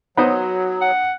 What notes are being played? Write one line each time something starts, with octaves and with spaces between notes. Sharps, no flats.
F#3 B3 D#4 C5
F#5